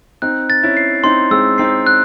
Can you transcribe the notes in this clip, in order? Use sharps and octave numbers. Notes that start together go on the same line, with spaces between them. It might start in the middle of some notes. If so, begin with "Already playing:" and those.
C4 D#4 F#6
A6
C#4 E4
C7
C4 D#4 C6
G#3 C4 E6
C4 D#4 C7
F#6